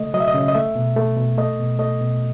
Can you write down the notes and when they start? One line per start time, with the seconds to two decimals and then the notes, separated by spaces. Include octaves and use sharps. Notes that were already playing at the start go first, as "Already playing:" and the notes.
Already playing: C#3 A3 D#5
0.14 F#3 D#5
0.20 E5
0.28 D#5
0.35 C#3
0.48 D#5
0.54 A3 E5
0.75 B2
0.96 A3
1.17 B2
1.38 A3 D#5
1.59 B2
1.79 A3 D#5
2.01 B2